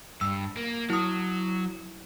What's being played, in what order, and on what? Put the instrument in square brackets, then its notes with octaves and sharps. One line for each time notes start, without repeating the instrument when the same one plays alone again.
[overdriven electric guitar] G2 [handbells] E6
[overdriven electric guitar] A#3
[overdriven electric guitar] F#3 [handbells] E4 D#6